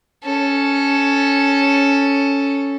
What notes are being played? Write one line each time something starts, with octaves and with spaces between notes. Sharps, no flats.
C#4 A4